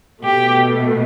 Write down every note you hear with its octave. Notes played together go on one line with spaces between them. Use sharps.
B2 A3 G4